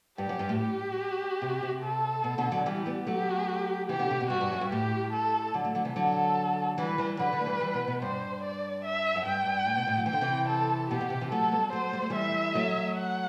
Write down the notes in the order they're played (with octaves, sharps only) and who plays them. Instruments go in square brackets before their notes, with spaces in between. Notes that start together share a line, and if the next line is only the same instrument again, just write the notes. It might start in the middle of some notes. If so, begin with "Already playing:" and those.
[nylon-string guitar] G2 [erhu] G4
[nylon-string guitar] F#2
G2
A2
[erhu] G4
[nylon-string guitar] C3
C3
[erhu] A4
[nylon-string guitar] B2
B2 D3
D3 F#3
[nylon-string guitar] E3 G3 [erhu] G4
[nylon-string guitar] G3 B3
[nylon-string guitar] F#3 A3 [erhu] G4
[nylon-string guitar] C3 E3 [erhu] G4
[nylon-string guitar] B2 D3
C3
B2
[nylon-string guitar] G2 [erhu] F#4
[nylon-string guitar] G2
F#2
G2
[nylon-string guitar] A2 [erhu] G4
[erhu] A4
[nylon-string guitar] D3 F#3
F#3 A3
D3 F#3
C3 E3
[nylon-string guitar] D3 F#3 [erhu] A4
[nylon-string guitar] E3 G3 [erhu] B4
[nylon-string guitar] E3 G3
[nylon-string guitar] D3 F#3 [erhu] B4
[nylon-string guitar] D3 F#3
A3
E3 G3
E3 G3
B2
B2
[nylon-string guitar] G2 [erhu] C5
[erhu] D5
E5
[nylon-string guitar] F#2
[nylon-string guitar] G2 [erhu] G5
[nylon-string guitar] G2
A2
B2
A2
F#3
[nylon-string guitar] E3 [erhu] G5
[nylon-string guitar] D3
C3 E3
[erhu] A4
[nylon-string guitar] B2 [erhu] G4
[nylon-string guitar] B2
C3
C3 E3
[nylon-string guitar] F#3 A3 [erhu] A4
[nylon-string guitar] G3 B3
[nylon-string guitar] F#3 A3 [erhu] C5
[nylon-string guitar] G3
A3
[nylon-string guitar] E3 G3 [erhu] E5
[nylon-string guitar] F#3 A3
[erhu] F#5